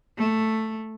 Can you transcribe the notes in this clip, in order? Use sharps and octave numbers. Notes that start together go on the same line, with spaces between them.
A3